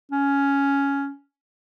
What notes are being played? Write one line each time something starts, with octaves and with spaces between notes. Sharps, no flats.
C#4